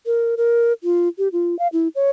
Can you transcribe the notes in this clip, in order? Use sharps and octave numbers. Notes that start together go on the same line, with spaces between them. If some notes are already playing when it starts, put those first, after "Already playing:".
A#4
A#4
F4
G4
F4
F5
E4
C#5